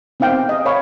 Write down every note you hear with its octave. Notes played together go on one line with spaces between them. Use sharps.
B3 C4 D#4 F5 G5
D#5
C#5 F5 B5